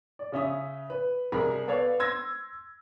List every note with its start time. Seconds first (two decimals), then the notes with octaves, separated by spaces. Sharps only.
0.19 D5
0.32 C#3 C#4 E5 D#6
0.90 B4
1.32 C2 G#4 A#4 G#5 A#5 B5
1.67 B3 A4 B4 C#5 D5 F5
1.99 C6 E6 G#6 A#6